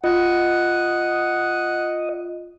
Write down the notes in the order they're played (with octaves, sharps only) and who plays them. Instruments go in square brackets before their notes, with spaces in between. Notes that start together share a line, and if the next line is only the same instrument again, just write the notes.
[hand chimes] F4 [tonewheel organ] D#5 [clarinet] F#5